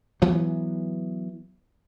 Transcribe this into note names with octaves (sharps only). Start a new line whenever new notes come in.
E3 F#3 B3